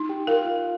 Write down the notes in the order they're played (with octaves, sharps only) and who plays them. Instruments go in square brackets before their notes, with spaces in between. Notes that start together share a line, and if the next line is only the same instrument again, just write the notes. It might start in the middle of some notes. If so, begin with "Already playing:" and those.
Already playing: [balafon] D#4
[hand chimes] G4 G5
[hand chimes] F4 F5 [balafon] A#4
[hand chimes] F4 F5